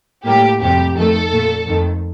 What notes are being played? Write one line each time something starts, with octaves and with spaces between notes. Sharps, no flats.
A2 G3 A#3 G4
F2 C3 G3 G4
F2 D#3 A3 A4
A#2 A3
F2 D#3 A3